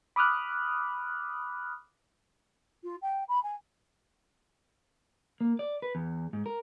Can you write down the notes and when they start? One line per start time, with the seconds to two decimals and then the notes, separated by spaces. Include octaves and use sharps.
0.16 B5 D6 D#6 F6 F#6
2.83 F4
3.02 G5
3.28 B5
3.43 G#5
5.41 A#3
5.59 D5
5.82 B4
5.95 E2
6.33 G#2
6.46 A#4